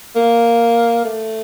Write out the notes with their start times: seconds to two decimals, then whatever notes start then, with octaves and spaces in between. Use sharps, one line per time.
0.16 A#3
1.05 A3